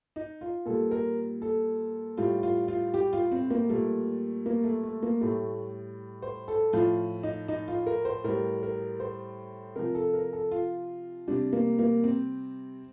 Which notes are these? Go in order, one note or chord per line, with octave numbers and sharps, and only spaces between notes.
D#4
F4
A#2 G3 A4
A#4
A4
A2 G3 F4
F4
F4
G4
F4
C4
A#3
A#2 G3 A3
A#3
A3
A3
A#3
A2 G3 A3
C5
A4
A2 F3 F4
D#4
D#4
F4
A#4
C5
A2 G3 A#4
A#4
C5
C3 F3 A#4
A4
A#4
A4
F4
C3 G3 D4
A#3
A#3
C4